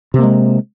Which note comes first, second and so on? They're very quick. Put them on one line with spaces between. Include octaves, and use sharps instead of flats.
C3 A#3 G#3